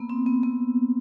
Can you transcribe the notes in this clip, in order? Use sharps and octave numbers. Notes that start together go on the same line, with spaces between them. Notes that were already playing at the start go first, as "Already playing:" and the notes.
Already playing: A#3 B3
C4
B3
B3